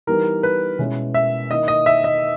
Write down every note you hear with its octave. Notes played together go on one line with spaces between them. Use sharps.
E3 G3 B3 D#4 A#4
B4
B2 G#3 C#4 E4
E5
D#3 A#3 E4 D#5
D#5
E5
D#5